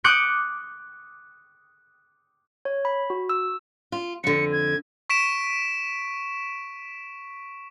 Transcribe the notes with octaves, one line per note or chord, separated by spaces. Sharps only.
D6 D#6 F#6 G6 C#7 D7
C#5
B5
F#4
E6
F4
F2 D3 C#7
G#6
C#6 B6 D7 E7